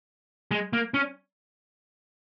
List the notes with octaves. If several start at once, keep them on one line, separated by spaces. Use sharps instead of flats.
G#3
A#3
C#4